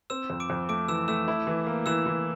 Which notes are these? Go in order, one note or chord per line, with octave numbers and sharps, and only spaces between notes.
C4 E6 E7
F2
D6 D7
F2
A3 D6 D7
E3 E6 E7
A3 E6 E7
E4
E3
A#3
E3 E6 E7
E3